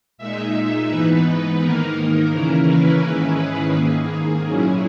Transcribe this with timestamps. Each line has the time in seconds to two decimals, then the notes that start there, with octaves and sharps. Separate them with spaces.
0.18 A#2 G#3 D#4 E5
0.88 G#2 E3 B3 D#4 B4
1.60 G#2 D#3 A#3 D#4 A#4
1.96 A#4
2.32 C#3 E3 A#3 C#4 E4
2.68 B4
3.03 G#2 D#3 G#3 C#4 E4
3.38 G#4
3.74 G#2 D#3 A#3
4.10 G#4
4.45 A#2 F#3 C#4 E4 G#4